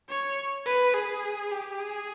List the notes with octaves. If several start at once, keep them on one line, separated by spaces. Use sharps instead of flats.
C#5
B4
G#4
G4
G#4